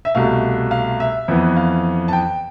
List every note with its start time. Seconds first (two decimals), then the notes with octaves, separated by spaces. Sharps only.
0.05 E5
0.15 C2 B2 A3 F5
0.71 F5
1.00 E5
1.28 F2 E3 B3
1.56 F5
2.08 A5
2.13 G5